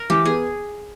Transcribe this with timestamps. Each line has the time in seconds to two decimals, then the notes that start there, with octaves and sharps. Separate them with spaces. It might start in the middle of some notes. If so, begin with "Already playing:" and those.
Already playing: A#4
0.10 E3 G4
0.25 B3 G#4